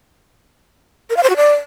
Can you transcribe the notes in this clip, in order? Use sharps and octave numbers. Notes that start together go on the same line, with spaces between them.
A#4
F5
C5
F#4
D5